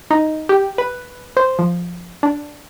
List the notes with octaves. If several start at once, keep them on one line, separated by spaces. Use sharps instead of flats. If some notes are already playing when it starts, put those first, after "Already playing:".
D#4
G4
B4
C5
F3
D4